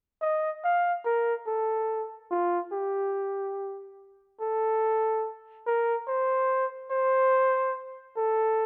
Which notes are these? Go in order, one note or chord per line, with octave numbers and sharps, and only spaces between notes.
D#5
F5
A#4
A4
F4
G4
A4
A#4
C5
C5
A4